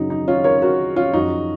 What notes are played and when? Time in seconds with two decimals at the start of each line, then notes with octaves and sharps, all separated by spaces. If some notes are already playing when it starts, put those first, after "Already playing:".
Already playing: F#2 C#3 F#3 D#4
0.10 D#4
0.28 C#4 F4
0.44 A#4 C#5
0.62 F#4 A#4
0.96 C#4 F4
1.13 F#2 F3 D#4 F#4